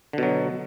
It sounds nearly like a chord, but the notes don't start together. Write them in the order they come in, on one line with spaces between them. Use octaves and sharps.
D3 B2 F#3